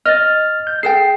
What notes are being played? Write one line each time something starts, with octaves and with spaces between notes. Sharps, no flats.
D#5 F6 A6
G6
G#4 A4 G5 C7